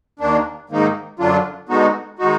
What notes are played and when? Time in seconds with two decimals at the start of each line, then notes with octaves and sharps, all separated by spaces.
0.20 D#2 D#3 A#3 D4
0.70 G#2 D#3 A#3 D#4
1.19 F#2 D3 F#3 D4 F4
1.69 D3 G#3 B3 D#4 F#4
2.19 D#3 G#3 D#4 F#4